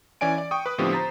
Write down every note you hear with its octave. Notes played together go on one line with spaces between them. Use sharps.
E3 C#4 D5 G#5 D7
D5
G5 C#6 D#6
B4 D#6
A2 D3 F3 B3 C4 G4
C5 A#5 A6 B6